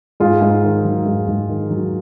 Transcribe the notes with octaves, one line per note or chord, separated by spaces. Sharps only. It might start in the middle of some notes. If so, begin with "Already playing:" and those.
G#2 F4 G#4
G#2
D#3
F#3
G#2
G#2
D#3
F#3